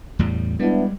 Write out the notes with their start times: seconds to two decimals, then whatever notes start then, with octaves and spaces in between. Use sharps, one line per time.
0.19 E2 A2 G3
0.60 G3 G#3 B3 D4 E4